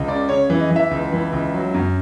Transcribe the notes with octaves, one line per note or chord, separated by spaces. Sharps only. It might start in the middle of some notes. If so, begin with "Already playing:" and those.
Already playing: C#2
C#3 D5
C#3 C#5
E3
D#5
E3
E5
C#2
E3
C#2
F#3
F#2